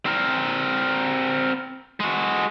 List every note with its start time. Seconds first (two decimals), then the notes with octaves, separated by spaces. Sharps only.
0.06 C4 A#4
2.00 G#3 F#4